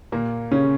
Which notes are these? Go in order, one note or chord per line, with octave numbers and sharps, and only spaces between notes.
A#2 A#3
C#3 C#4